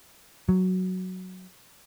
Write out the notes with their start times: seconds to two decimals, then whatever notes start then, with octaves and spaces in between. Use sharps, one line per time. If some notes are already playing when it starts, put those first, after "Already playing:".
0.49 F#3